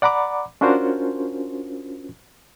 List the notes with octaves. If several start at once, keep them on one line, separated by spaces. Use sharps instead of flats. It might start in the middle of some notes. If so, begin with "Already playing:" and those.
D5 F#5 A#5 B5 D6
C#4 D4 F4 F#4 A#4 C5